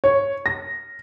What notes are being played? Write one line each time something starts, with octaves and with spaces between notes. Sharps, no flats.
C#5
A#6